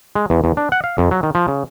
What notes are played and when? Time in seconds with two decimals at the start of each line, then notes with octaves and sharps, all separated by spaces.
0.15 G#3
0.30 E2
0.44 E2
0.57 D4
0.72 F#5
0.84 F5
0.98 F2
1.11 F#3
1.23 D#3
1.35 F3
1.48 C#3